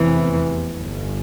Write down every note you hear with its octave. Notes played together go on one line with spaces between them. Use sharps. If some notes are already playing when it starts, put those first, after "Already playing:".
Already playing: F1 E2 C3 E3
G1 G2